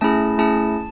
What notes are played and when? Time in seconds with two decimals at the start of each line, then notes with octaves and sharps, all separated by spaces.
0.01 A3 C#4 E4 G#4 A5
0.38 A3 C#4 E4 G#4 A5